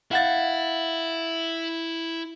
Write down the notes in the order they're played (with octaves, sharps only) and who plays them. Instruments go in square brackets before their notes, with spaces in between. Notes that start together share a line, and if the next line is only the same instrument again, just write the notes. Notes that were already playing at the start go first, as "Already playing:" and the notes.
[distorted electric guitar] E4 [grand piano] F5 F#5 A6